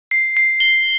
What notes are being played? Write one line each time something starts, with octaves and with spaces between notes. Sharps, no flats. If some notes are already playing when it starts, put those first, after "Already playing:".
C7
C7
G7